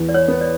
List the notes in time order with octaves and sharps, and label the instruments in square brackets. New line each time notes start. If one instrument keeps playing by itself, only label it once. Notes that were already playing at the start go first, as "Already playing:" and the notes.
Already playing: [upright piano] E2 B3
[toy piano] D5
C#5
[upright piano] B3
[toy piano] D5